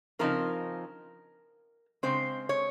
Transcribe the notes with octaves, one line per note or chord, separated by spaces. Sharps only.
C#3 F3 C4 D#4 A#4
C#3 G#3 C4 C5
C#5